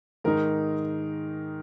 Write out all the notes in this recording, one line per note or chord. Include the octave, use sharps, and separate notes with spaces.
G#2 D#3 G#3 D#4 A#4